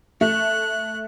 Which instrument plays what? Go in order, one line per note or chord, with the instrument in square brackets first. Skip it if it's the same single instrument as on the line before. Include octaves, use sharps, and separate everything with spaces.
[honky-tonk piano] A3 [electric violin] F#6